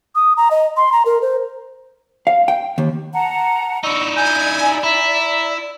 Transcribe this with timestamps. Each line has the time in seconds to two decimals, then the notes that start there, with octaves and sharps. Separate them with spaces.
0.15 D#6
0.37 A#5
0.51 D#5
0.77 C6
0.92 A#5
1.06 A#4
1.22 C5
2.27 F5
2.48 G5
2.78 D#2
3.13 F#5 A5 A#5
3.84 D#4 E4 D5 C#6 E6
4.16 G#5 G6
4.84 E4 E5 A#5